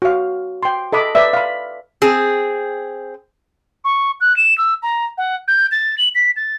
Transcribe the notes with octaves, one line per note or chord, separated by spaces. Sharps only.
F#4 F5
G5 C6
A4 D#5 B5 D6
B4 D5 E5
F5 B5
C4 G#4
C#6
F#6
E7
E6
A#5
F#5
G6
A6
F#7
B6
A6